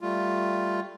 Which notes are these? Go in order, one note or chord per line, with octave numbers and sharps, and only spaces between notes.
G3 A3 F4